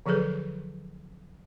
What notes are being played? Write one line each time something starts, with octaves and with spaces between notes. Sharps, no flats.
D3 F3 F#3 G#4 A4 B4